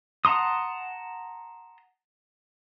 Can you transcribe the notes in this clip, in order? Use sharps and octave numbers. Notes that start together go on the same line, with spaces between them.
F#5 A5 A#5 C6 D#6